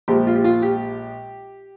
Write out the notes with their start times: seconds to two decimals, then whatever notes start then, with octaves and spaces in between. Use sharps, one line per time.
0.08 A#1 A#2 F3 G#3 G4
0.27 F4
0.35 G4
0.44 F4
0.62 G4